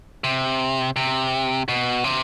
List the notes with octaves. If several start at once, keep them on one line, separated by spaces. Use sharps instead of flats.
C3
C3
B2
C3